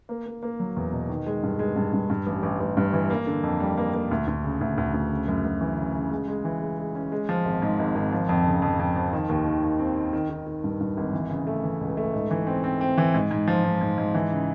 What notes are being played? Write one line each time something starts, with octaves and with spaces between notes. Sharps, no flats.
A#3
A#3
A#3
F#3
E2
B2
D#3
G#3
G2
G#3
G2
G2
G2
A1
A1
A1
G2
E3
A#3
D3
F2
G3
A#3
A#3
D2
D2
C#3
D2
D2
D2
C#3
F#2
F#2
E3
C#3
C#3
G#3
G#3
E3
G#3
G#3
C#4
G#3
F3
G#1
G#2
G#1
G#1
F3
F2
C#3
F2
F2
F3
D#3
D#2
D#3
D#3
C4
D#3
D#3
D#3
D#3
G2
G2
G#1
E3
C#3
A3
E3
C#2
A3
G#2
E3
C4
C4
C4
E3
G#2
G#2
F3
G#2
G#2
G#2
E3
C#3